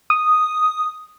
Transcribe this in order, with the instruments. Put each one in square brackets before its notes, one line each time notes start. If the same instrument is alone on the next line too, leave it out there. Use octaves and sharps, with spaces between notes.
[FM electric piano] D#6